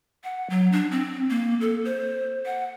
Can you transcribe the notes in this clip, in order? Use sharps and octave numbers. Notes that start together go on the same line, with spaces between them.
F#5
F#3
D4
C4
A#3
A4
C5
F#5